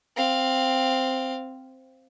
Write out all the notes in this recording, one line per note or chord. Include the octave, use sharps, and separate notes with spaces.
C4 F5